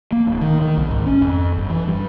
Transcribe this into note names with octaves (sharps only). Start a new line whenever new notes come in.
A#3
D1
D#3
D#3
C2
G#1
C#4
F2
G1
E3
G2